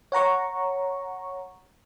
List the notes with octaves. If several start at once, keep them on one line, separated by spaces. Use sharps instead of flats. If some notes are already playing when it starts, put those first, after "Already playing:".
C#5 F#5 A#5 C#6